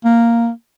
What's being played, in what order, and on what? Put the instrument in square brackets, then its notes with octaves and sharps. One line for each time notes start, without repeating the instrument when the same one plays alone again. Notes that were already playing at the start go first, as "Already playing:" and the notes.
[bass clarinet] A#3